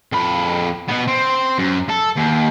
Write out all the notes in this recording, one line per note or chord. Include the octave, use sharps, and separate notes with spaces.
F2 B5
B2 B3
C4
F#2
A4
D#2